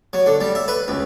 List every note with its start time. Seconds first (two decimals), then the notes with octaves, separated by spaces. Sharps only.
0.13 F#3
0.26 D3
0.41 G3
0.55 E5
0.68 B4
0.88 C#2